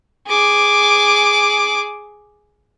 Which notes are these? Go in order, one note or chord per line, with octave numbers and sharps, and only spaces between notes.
G#4 D6